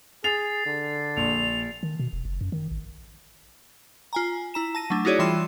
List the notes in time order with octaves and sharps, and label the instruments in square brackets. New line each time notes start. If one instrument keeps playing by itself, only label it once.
[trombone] G#4 [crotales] A6 C7 [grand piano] F7
[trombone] D3
[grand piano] A#1 [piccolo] F7
[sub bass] D#3
B2
E1
F#1
F#2
D#3
A1
[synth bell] F4 G#5 A#5
E4 A#5 E7
A5 A#6 D#7
F#3 A3 D4
D#4 E4 F#4 G#4 C#5 D5
E3 G3 F4 C6 E6 E7